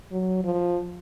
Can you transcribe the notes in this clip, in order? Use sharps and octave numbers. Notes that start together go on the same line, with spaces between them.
F#3
F3